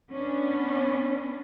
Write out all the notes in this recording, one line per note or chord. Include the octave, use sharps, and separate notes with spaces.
B3 C#4 D4